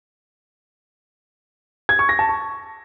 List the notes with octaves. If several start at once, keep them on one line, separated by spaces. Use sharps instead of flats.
G#6
C#6
A#6
A5
C#6